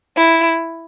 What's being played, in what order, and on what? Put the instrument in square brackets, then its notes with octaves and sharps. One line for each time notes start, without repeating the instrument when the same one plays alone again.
[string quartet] E4